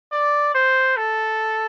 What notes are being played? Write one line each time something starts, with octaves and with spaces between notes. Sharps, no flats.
D5
C5
A4